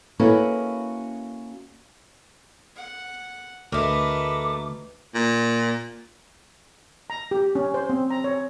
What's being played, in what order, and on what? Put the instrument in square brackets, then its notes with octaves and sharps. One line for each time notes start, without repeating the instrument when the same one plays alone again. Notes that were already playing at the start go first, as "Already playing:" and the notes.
[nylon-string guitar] A#3 C#4 E4 F#4 A4 B4
[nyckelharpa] F#5
[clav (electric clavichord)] D2 [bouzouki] A3 A#4 [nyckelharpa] B4 D#5 [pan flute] D6
[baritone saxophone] A#2
[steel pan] A#5
G4
C#4
C5
C4
A#5
C#5